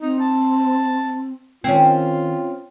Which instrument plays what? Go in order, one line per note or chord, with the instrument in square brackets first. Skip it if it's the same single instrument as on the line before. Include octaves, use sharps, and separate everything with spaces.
[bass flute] C4 [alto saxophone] D#4
[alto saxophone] A5
[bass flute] D#3 [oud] C4 C#4 [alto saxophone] F4